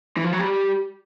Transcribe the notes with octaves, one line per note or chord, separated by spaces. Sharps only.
E3
F3
F#3
G3